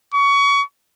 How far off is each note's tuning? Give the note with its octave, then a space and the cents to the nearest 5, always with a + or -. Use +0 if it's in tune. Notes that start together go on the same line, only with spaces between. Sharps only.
C#6 +25